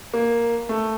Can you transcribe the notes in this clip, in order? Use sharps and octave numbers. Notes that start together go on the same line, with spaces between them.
A#3
A3